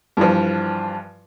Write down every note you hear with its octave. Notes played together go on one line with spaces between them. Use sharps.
G2 E3 F3